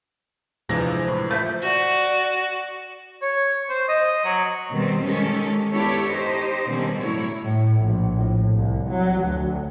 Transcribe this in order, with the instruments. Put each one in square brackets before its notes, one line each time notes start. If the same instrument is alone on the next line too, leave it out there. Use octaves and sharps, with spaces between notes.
[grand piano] F2 C3 A#6 [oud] E3 F3 [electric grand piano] G#3 D4 E4
[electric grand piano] A2
[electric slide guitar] A3 C5 E5
[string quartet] F#4 D5
[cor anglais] C#5
C5
D#5
F#3
[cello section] B2 D#3 G3 C4
D#3 G#3 C#4 G4 A4
B3 D4 E4 G4 A4 C#5
D#4 G4 C5 D#5
B2 D3 D#3 G3 C4 C#4
A2 F#3 G3 E4 C#5
[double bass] A2
A#1
A2
C2
F#3
D2